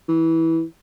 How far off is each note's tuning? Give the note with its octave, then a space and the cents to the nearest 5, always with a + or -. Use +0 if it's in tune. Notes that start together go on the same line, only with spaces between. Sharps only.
E3 -15